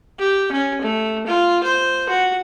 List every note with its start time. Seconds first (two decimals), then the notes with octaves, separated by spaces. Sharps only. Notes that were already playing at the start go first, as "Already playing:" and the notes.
0.18 G4
0.52 C#4
0.82 A3
1.26 F4
1.64 C5
2.09 F#4